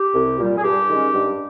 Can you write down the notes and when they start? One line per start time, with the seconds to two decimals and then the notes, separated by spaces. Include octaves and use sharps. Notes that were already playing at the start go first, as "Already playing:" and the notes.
Already playing: G4
0.14 C2
0.39 A#2 G3
0.58 G#4
0.64 G2 G4
0.89 D#3 G#3 C#4
1.13 G2